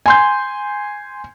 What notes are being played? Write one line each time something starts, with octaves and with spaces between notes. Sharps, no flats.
G#5 C6 G6